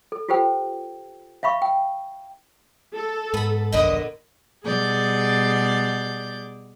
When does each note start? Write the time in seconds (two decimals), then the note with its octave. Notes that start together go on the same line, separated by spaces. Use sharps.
0.12 A4
0.29 F4 G4 A4 C5 G5
1.43 E5 F5 B5 C#6
1.62 G5
2.95 A4
3.34 G#2 B3 B5
3.72 F#1 B1 F2 A#2 D3 B3 D#5
4.63 B2 G3 G#4 D5 G6